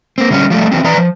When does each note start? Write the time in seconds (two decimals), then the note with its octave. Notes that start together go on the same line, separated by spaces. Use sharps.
0.18 A#3 C4
0.31 D3 G3 C#4
0.50 F3 G3 A3
0.72 E3 F#3 C4
0.84 E3 B4 D5 A#5
0.98 F3